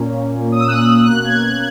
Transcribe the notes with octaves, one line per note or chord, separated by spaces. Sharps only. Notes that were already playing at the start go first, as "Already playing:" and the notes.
Already playing: A#2 A#3 C#4
D#6
E6
F#6
B2 A#3 C#4 F#6
G#6
F#6